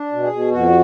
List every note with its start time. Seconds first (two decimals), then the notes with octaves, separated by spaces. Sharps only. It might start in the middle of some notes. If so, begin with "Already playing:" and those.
Already playing: D4
0.12 B2
0.23 G#4
0.33 B2
0.52 F2 F#4